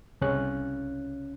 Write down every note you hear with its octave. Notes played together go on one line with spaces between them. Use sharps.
C2 C#3 C#4 F#6